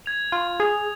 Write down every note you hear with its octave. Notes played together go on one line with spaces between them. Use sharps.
G#6 F7
F4
G#4 G#6 F7